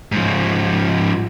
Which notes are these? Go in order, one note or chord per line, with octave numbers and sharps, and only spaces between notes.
G#2 F3